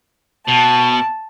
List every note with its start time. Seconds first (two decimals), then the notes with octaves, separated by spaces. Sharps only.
0.48 B2 A5